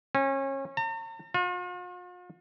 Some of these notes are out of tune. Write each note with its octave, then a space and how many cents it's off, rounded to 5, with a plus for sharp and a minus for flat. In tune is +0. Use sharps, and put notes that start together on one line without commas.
C#4 -30
A#5 -45
F4 +45